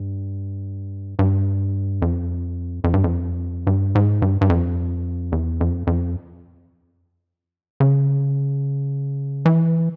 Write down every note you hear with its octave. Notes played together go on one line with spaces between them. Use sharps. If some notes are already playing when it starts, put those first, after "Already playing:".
Already playing: G2
G2
F2
F2
G2
F2
G2
G#2
G2
G2
F2
E2
F2
F2
C#3
E3